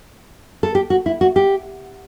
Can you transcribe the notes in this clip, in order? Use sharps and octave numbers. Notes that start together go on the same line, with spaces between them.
A4
G4
F#4
E4
F#4
G4